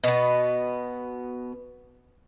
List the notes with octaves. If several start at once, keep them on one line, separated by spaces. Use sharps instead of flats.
B2 B3